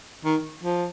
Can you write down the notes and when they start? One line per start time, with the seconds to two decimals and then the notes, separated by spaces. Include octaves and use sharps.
0.25 D#3
0.63 F3